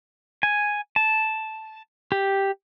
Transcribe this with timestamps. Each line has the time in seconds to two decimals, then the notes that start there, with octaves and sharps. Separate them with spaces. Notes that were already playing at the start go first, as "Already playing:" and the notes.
0.43 G#5
0.96 A5
2.12 G4